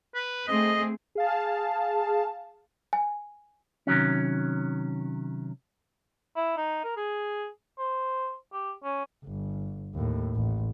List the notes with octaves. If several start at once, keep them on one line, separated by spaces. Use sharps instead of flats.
B4
A3 C4 G#4 D#5
G#4 F5 A5
G#5
C3 D#3 F#3 C#4
E4
D#4
A#4
G#4
C5
G4
C#4
G1
D#2 A2
A1